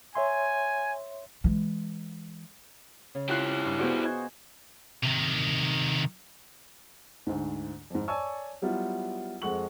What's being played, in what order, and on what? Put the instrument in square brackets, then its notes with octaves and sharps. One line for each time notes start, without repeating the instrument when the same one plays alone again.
[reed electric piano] C#5 E5 C6 [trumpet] G#5
[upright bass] E3 G#3
[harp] C#3
[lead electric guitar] E4 G4 [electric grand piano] F4 F#6 C7
[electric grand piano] G2
[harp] B3 F4 D5 [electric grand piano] F#4 G#4 C5
[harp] D#5 G#5
[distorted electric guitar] C3 D#3
[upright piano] D2 G#2
F2 G#2
C#5 D5 G#5 A5 C#6 E6
F#3 G3 B3 E4 F4
F2 G#3 A4 F#5 C#6 F#7